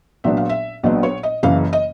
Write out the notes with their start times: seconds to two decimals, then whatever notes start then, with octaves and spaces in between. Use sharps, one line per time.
0.24 A#1 A#2 F#3 B3 D4 E5
0.37 F5
0.49 E5
0.83 A#1 A#2 F#3 B3 D4 D#5
1.03 C#5
1.23 D#5
1.43 F#1 F#2 C#3 E3 F5
1.73 D#5